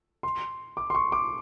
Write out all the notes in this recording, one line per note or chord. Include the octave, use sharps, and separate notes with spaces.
C6
D6
C6
C#6
D6